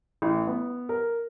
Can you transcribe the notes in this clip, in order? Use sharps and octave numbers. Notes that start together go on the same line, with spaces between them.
A1
B3
A#4